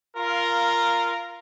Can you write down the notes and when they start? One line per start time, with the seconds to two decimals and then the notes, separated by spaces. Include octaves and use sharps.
0.16 F4 A#4 F5